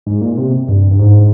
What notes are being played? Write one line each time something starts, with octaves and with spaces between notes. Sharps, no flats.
G#2
A#2
C3
G2
G2
G#2